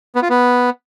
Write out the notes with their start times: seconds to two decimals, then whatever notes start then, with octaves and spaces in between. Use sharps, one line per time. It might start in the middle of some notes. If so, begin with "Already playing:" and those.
0.15 B3
0.22 F4
0.29 B3